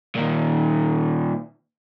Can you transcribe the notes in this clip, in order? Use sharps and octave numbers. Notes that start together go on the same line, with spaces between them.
A#2 D#3